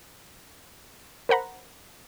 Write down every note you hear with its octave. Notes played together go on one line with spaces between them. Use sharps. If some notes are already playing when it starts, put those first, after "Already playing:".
A#4 C5 F#5 A#5 B5